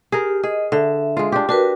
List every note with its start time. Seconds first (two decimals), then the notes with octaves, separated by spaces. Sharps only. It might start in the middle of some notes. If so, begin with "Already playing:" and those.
0.12 G4 G#4 A#4
0.44 G#4 D#5
0.72 D3 E5
1.17 G#3 F4
1.32 D4 G4
1.49 D4 F#4 A#4 B4